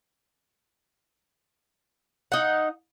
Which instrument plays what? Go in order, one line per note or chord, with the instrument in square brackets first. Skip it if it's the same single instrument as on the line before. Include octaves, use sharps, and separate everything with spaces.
[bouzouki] D#4 F#5